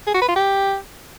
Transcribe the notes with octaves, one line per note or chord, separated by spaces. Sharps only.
G#4
F#4
B4
F4
G4